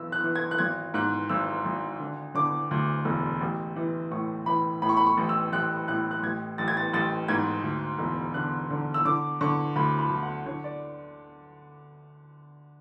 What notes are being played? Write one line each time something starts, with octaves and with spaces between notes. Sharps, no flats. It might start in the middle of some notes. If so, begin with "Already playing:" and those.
Already playing: B1 E3 E6
F#6
E3
G#6
F#6
G#1 G#6
G#2 F#6
G#1 E6
G#1
D3
D3 D6
D2
E1
A1
E3
A2 C#6
E3 B5
A2 B5
C#6
B5
C#6
A1
E6
A1 F#6
A2 F#6
F#6
A1 G#6
A1 A6
G#6
A6
A1 A6
G#2 G#6
D2
E1
D3 F#6
D3
E6
D3 D6
D3 C#6
D2 B5
B5
D2
F#5
D3 C#5
D5